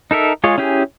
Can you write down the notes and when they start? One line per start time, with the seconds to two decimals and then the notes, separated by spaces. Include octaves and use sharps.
0.11 D#4 A4 A#4 E5
0.44 G#3 F4 G#4 C#5
0.58 C#4 E4 G4 G#4